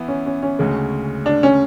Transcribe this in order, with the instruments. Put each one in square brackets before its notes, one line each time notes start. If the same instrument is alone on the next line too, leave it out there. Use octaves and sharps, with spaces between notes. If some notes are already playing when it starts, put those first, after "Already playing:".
Already playing: [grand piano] E3 B3 E4
[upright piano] C#4
C#4
C#4
[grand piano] D2 C#3 G#3
[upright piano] D4
C#4